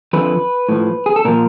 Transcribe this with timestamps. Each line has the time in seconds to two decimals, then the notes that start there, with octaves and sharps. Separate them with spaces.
0.13 F2 D3 F3 B4
0.69 A2 F3
1.06 G#4
1.16 A4
1.25 A#2 F3 A#4